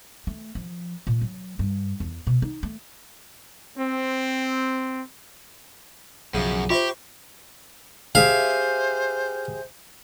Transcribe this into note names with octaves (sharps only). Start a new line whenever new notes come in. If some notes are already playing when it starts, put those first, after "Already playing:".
A3
F3
A#2
F#3
G2
E2
B2
D#4
A3
C4
B1 F#2 C#3 F3
F4 G4 C5 E5 C#6
G4 G#4 C5 E5 F5